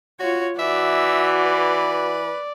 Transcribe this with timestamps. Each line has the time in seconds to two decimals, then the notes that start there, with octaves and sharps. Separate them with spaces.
0.20 F4 F#4 C#5
0.59 E3 F#4 D5 E5
1.45 B4